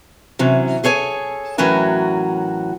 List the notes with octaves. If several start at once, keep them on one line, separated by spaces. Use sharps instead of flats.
C3 E3 F#3 C#4
G#4 A4 C#5 G#5
A2 E3 F#3 C#4 F#4 A#4